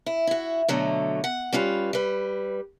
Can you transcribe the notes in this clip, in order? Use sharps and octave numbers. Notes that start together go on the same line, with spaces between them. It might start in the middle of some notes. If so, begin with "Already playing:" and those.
E4
E4 F#4
B2 D3 F#3 A3
F#5
G3 C#4 F4 B4
G3 B4